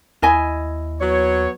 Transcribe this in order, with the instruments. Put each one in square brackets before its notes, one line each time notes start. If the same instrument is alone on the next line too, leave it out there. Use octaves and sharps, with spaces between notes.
[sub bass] D#2 [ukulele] E4 D#5 G#5
[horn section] F#3 B3 C#5